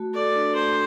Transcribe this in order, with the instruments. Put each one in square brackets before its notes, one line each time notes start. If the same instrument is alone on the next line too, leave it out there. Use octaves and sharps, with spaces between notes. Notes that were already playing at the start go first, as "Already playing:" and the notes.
Already playing: [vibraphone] A3 F#4
[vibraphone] A4 [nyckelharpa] D5
[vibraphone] D4
[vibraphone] A3 [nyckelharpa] C5